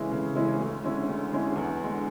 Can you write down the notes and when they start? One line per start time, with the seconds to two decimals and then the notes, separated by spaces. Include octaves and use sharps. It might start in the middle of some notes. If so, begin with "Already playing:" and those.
Already playing: C#3 E3 G#3 C#4 E4
0.11 C#3
0.36 E3 G#3 C#4 E4
0.60 D2
0.83 D3 G#3 C#4 E4
1.08 D2
1.31 D3 G#3 C#4 E4
1.56 E2
1.81 D3 G#3